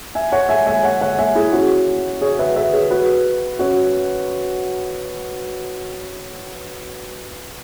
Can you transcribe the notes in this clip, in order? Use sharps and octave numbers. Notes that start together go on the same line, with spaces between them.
E5 G#5
C#5 F#5
E5 G#5
E5 G#5
C#5 F#5
C#5 F#5
E5 G#5
E4 G#4
C#4 F#4
G#4 C#5
B4 E5
B4 E5
G#4 C#5
F#4 B4
C#4 F#4